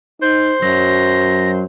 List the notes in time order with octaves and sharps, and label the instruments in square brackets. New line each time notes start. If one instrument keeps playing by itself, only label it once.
[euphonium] D#4 [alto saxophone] C5 [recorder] G6
[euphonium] F#2 [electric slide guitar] F#3 [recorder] A#6